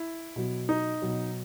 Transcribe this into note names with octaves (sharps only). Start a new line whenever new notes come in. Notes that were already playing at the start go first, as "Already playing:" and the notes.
Already playing: E4
B2 F#3
D#4
B2 F#3